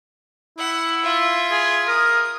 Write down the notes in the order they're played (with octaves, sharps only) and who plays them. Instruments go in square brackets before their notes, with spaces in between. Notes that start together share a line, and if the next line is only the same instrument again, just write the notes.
[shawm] E4 [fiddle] F#5
[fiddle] F4 E5
[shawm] G#4
[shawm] A#4 [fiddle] D#6